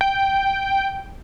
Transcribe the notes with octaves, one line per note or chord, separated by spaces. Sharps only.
G5